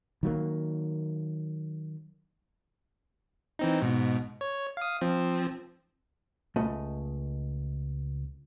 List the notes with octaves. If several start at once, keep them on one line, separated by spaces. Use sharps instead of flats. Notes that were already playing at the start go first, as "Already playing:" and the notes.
D#3 F#3 A#3
E3 C4 D#4
G#2 B2
C#5
F5 D#6
F3 C4
C#2 A3 D#5